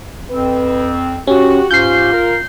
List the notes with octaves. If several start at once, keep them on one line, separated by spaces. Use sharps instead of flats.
F2 C4 B4
C#4 F#4 G4
G#2 C#4 F4 G4 G6 C7
A#4